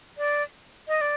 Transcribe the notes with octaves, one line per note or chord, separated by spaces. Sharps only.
D5
D#5
D5